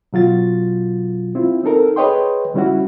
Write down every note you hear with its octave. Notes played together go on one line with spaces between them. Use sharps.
B2 F#3 F4 A6
C4 E4 F4
C4 D#4 A4 A#4
G#4 B4 C#5 D#5 G5 C6
C#3 G3 C#4 E4 F#4